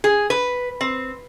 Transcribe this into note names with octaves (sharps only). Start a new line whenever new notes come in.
G#4
B4
C4